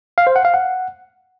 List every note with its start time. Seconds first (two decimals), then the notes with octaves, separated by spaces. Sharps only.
0.18 F5
0.27 C5
0.36 F#5
0.45 F5
0.54 F#5